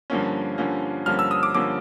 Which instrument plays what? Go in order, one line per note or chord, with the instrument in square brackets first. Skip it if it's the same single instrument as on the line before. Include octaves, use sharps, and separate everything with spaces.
[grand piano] G2 D3 F3 A#3 C#4
G2 D3 F3 A#3 C#4
G2 D3 F3 A#3 C#4 F6
E6
D#6
D6
G2 D3 F3 A#3 C#4 D6